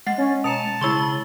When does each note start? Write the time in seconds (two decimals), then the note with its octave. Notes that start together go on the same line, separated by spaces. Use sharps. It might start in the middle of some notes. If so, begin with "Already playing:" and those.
0.07 G#3 F#5 A6 C7
0.18 C#4
0.44 B2 A5 A#5 C#7 F7
0.81 C#3 G#3 E4 C6 C#6 G7